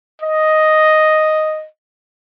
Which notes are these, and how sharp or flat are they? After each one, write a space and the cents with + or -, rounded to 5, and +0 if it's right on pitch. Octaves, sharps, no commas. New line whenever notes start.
D#5 +0